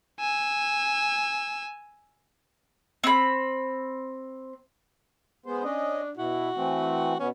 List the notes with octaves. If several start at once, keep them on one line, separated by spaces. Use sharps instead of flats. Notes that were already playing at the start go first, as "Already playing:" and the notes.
G#5 E6
C4 B5
G#3 B3 C5
C#4 D4 D#5
B2 E4 F#4
E3 A3 C4
B2 B3 C#4